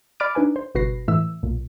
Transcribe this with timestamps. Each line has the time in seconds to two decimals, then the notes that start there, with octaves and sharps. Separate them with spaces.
0.20 D5 B5 D6 F6 A6 D7
0.35 D4 D#4 B4 G#5
0.56 C5
0.75 G1 B2 F#4 B4 A#6 C7
1.08 A2 E3 E5 E6
1.43 B1 A#2